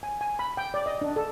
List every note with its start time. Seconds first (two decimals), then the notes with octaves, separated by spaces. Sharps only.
0.03 G#5
0.21 G#5
0.39 B5
0.57 G5
0.74 D5
0.86 D#5
1.01 D4
1.16 A4